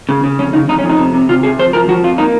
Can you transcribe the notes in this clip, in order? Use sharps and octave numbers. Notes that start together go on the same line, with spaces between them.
C#3
C#3
F2 C#4
C#3 D#4
F2 D#4
C#4
F2
D#4
C3
C3
C3 F4
C3 G#4
F3 C5
F3 A#4
F3 F#4
F2 F4
A#3 D#4